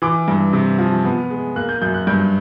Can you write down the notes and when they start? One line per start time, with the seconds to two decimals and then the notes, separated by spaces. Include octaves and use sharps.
0.02 E3 D6
0.28 G2
0.53 C3
0.79 F3
1.05 B3
1.30 G#3
1.56 A#3 F#6
1.69 G6
1.82 F#2 G6
1.94 F#6
2.07 G2 G6